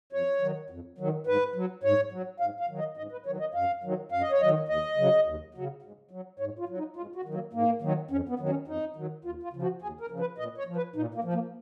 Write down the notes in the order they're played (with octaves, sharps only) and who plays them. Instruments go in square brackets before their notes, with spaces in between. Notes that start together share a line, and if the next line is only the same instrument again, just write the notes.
[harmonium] F2 C#5
D#3 F#3
F2
D#3 F#3
G#2 B4
F#3
G#2 C#5
F#3
G#2 F5
F5
D#3 F#3
D#5
G#2 D#5
B4
D#3 F#3 C#5
D#5
F#2 F5
D#3 F#3
F#2 F5
D#5
C#5
F#3 D#5
D#3
D#2 D#5
C#3 F#3
D#2
C#3 F#3
G#2
F#3
G#2 C#5
F4
F#3
D#4
G#2 F4
F#4
D#3 F#3
A#3
G#2 A#3
D#3 F#3
F2 C#4
B3
D#3 F#3
C#4
F2 D#4
D#3 F#3
D#2 F4
F4
C#3 F3
F#4
D#2 G#4
A#4
C#3 F3
B4
A#2 D#5
C#5
F3
B4
A#2 D#4
A#3
F3
A#3